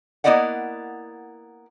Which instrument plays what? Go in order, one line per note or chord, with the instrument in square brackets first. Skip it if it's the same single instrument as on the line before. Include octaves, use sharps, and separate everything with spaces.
[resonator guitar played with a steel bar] A#3 B3 E4 D5 D#5 F#5